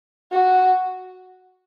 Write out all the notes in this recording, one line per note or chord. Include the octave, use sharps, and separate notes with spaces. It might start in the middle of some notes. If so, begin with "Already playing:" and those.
F#4